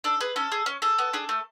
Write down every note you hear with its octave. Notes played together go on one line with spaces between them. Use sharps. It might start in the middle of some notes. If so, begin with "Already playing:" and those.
D4 A4
G#4 B4
C#4 A4
G#4
C#4
G#4 A4
B3
D4 G#4
A3